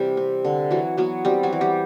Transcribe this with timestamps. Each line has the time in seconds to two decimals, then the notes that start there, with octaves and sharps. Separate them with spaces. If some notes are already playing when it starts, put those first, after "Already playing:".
Already playing: C3 E3 G3 G4
0.17 C4
0.45 D3
0.71 E3 F#3 F#4
0.97 F#3 B3 F#4
1.25 G3 C4 G4
1.43 F#3 F#4
1.53 E3
1.61 G3 G4